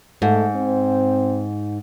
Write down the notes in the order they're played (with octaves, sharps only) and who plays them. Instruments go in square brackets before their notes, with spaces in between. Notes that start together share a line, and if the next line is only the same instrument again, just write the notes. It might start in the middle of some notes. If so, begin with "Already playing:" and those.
[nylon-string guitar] G#2 [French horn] A3
[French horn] C4